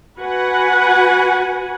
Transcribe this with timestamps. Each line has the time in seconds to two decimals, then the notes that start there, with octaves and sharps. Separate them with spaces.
0.17 F#4 B4 F#5 G#5